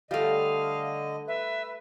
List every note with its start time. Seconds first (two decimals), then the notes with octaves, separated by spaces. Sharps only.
0.11 D3 G3 A3 D#5 F5
1.28 B4 E5